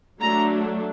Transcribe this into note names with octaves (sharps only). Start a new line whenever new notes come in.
F#3 A3 D4 A#5